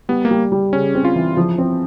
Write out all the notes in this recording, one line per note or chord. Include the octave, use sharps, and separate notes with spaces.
G3 B3
A#3
G3
G3
C#3 C#4
C4
F4
E3
F3
C4